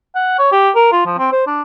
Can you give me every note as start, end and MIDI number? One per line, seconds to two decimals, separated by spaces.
0.15 0.38 78
0.39 0.50 73
0.52 0.70 67
0.75 0.92 70
0.92 1.04 65
1.06 1.15 53
1.18 1.29 60
1.32 1.44 72
1.47 1.62 62